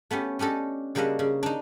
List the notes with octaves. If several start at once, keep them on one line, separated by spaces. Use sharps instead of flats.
A3 B3 C#4 G4
C#4 D4 G4 A4 D#5
C#3 G3 A#3 D4 D#5 F#5
C#3
D4 D#4